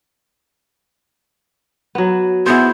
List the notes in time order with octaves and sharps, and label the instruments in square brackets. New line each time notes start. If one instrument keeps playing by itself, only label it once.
[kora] F#3 B3
[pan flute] B3 [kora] E4 G#4 C5